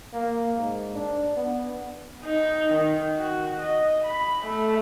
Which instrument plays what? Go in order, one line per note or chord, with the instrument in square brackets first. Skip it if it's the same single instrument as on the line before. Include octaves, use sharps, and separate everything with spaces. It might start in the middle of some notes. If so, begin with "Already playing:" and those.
[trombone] A#3
G#2
D4
B3
[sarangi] D#4
D#3
F#4
D#5
B5
A3